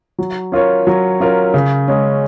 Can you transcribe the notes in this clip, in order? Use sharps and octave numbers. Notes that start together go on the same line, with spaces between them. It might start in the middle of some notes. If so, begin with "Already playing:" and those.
F#3
C#4 F4 A#4 C#5
F#3
C#4 F4 A#4 C#5
C#3
G#3 C#4